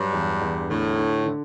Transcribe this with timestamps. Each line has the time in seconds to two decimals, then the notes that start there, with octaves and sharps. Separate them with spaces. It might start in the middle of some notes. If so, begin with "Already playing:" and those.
Already playing: G2 F#3
0.13 E2
0.41 E2
0.70 A2 D3
0.98 D3
1.26 D3